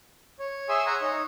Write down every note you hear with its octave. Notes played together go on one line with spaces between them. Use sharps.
C#5
G#4 C#5 E5 G#5 C6 E6
F#5 G#5 A#5 C6 E6
D#4 C#5